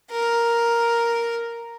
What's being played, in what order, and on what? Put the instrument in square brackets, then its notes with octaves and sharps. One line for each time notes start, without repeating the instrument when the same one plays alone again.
[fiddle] A#4